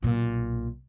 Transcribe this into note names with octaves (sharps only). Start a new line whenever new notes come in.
B1 A#2